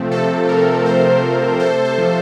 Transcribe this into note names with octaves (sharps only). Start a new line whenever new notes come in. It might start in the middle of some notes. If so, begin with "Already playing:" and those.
Already playing: C3 F3 A3 C4
C3 A4
F3 A#4
C4 A4 C5
A3
C3 A4 C5
A4
F3